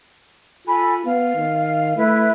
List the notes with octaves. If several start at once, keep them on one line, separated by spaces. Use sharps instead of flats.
F4 A4 G#5 B5
B3 F5
D#3
A3 E4 B4 E5